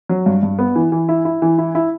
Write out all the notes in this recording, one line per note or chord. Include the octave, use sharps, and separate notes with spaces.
F#3
G2
G2
B3
E3
E3
E4
E4
E3
E4
E4